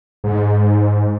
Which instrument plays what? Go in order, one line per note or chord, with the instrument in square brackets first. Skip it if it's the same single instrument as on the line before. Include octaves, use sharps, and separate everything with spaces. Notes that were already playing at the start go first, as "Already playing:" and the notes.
[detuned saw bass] G#2